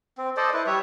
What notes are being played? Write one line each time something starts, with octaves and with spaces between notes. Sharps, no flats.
C4
A4 C5 D5 D#5
E4 B4
G3 C#5 E5